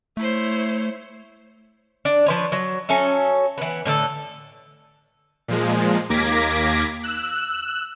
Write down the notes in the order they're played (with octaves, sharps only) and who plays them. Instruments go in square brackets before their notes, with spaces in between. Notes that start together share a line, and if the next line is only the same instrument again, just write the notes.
[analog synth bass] A3 [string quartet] E4 C5 C#5
[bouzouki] D4
F3 B4 C#5
F#3
F#3 C#4 A4 E5
E3 B3
A2 D3 F4 A4
[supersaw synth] A#2 F3 G#3
D#2 A#3 D6 G#6 A#6 B6
E6 F#6